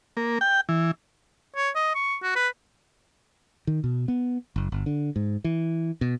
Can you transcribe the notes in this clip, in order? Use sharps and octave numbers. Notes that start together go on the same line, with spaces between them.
A#3
G5
E3
C#5
D#5
C#6
F#4
B4
D#3
B2
B3
F#1
G1
D3
G#2
E3
B2